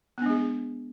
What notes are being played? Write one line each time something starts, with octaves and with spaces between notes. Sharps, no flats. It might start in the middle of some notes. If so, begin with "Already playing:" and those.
G#3 B3 D4 G#4